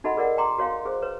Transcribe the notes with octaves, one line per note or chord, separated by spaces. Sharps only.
D#4 F#4 A4 D#5 F#5 B5
G#4 A#4 D5 D#5 F#5
G5 A#5 C6 D6
F#4 C#5 F5 G5
G#4 C5
B4 C#5